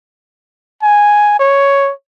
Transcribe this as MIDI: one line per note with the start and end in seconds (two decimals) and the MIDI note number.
0.83 1.36 80
1.40 1.91 73